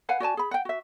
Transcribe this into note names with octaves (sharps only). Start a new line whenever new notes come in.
B4 F5 F#5 G#5
F#4 D5 G#5 A5
G#4 B5
F#5 G5
F#4 E5